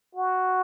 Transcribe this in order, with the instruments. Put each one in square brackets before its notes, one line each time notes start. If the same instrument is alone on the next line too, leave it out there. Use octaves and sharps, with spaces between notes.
[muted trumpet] F#4